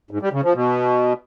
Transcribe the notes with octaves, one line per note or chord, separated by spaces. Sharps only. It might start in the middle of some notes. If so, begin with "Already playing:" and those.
G#2
G3
C#3
F3
B2